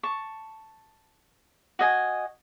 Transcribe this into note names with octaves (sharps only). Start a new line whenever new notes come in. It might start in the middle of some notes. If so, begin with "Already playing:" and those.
A5 C#6
F#4 D#5 G#5